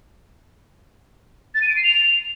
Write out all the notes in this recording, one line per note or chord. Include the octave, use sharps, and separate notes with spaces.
A6
D#7
D7
C7
F7